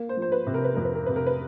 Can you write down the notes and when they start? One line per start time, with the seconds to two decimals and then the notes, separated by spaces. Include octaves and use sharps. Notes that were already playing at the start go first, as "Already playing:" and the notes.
Already playing: A#3
0.09 C5
0.17 F3
0.22 C5
0.32 B4
0.47 C3
0.54 A#4
0.64 B4
0.75 F2 A#4
0.85 B4
0.95 A#4
1.06 C3 B4
1.16 A#4
1.26 B4